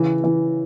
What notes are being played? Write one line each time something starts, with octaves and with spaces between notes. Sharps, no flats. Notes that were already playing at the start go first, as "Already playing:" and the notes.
Already playing: C#3 E3
E3